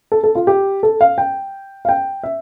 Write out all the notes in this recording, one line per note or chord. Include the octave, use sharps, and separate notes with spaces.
A4
A4
F4
G4
A4
F5
G5
F5
G5
E5